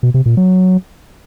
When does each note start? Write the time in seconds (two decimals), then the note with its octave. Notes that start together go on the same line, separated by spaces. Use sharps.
0.03 B2
0.14 C3
0.26 A#2
0.37 F#3